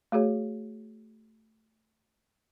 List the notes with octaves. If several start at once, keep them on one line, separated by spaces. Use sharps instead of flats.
A3 F#4 G#4 C#5